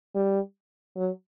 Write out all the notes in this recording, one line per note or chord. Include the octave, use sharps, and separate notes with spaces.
G3
F#3